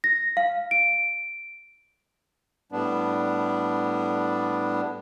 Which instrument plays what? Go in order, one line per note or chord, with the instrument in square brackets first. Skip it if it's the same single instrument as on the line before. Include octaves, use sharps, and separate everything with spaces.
[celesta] A#6
F5
D7
[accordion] A2 G3 B3 D4